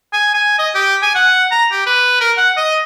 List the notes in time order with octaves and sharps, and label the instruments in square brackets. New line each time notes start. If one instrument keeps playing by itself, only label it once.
[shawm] G#5
G#5
D#5
G4
G#5
F#5
A#5
G4
B4
A#4
F#5
D#5